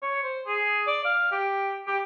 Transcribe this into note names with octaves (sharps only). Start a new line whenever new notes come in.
C#5
C5
G#4
D5
F5
G4
G4